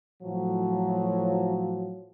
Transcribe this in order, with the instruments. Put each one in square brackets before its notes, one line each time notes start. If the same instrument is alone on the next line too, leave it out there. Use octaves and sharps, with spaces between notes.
[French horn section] A2 F3 F#3